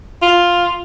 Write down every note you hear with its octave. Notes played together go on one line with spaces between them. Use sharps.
F4